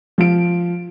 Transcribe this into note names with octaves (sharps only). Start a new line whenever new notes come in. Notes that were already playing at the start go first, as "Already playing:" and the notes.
F3 F4 D7